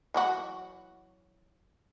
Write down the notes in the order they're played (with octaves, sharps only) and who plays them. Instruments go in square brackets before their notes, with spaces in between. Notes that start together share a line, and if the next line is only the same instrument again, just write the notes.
[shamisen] E3 F#3 F#4